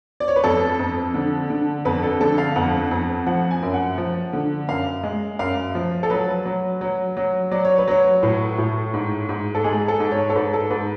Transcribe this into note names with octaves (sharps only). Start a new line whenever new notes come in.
D5
C#5
B4
F2 A4
F2
D3
D3
F2 B4
A4
D3 A4
F5
F2 F#5
F2
F3 F#5
G#5
F#2
F#5
F3
D3
F#2 F5
G#3
F#2 F5
F3
A4
F#3 B4
F#3
F#3
F#3
F#3 D5
C#5
B4
F#3 C#5
A2 B4
A2
G#2
G#2
A4
G#3 G#4
A4
G#2
C#5
A4
G#2 B4
A4
G#2 B4